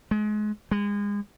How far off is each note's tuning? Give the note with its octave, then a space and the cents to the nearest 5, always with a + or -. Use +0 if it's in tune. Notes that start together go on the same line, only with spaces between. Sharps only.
G#3 +30
G#3 -30